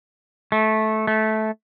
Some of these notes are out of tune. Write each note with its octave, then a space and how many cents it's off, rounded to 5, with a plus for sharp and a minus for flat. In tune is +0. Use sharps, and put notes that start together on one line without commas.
A3 -15
A3 -15